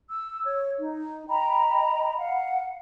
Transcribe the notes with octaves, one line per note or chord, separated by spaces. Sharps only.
E6
C#5
D#4
D#5 G5 A#5 B5
F5 F#5